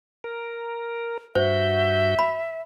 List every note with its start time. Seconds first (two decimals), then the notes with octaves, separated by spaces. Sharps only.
0.24 A#4
1.35 G2 F#4 C5 E5 G6
2.19 B5